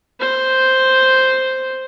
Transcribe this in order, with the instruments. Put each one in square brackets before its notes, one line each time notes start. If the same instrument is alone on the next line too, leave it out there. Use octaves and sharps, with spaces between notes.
[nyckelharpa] C5